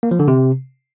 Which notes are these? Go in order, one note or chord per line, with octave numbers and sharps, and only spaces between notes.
A#3
F3
D3
C3